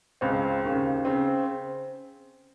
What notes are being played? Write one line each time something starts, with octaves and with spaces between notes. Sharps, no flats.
C#2 C#3 C4
D#2 C#3
C#3 C4